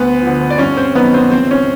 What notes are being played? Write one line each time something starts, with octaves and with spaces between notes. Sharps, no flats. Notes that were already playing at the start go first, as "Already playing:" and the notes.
Already playing: D2 B3 B4
F3
D3
D5
G2 C#4 C#5
C4 C5
D#3 F#3 B3 B4
C4 C5
C#2 C4 C5
C#4 C#5